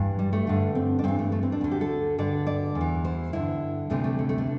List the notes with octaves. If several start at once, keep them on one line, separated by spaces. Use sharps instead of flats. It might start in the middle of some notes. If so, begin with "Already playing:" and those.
Already playing: G2 E3
G3
A3
G2 D3
C4
D4
G2 E3 C4
A3
A3
C4
D4
D2 D3
G4
A4
G2 D3 D5
D5
E2
E3
C5
G2 D3 E4
D2 C3 E3 A3
A3
A3
A3
D4